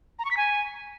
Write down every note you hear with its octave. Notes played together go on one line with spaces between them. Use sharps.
A#5
C#6
B6
G#5